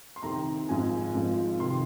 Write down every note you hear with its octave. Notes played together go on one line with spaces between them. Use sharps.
C6
C2 C3 D#3 A#5
G#1 G#2 F3 G#5
G#1 G#2 F3
F1 D#3 C6